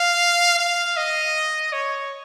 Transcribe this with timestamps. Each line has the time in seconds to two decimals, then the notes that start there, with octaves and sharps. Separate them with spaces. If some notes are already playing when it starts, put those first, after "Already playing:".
Already playing: F5
0.59 F5
0.97 D#5
1.73 C#5